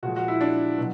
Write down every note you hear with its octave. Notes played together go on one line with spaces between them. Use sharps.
A#2 F3 G#3 F#4
F#4
E4
D4
B2 F#3